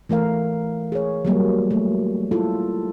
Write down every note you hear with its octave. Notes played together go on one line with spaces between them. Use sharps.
E3 A3 A#4 F5
G#4 C#5
F#3 G3 A#3
A3
E4 F4 A4